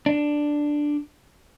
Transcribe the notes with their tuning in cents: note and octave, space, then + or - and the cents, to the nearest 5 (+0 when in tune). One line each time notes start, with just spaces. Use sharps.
D4 +5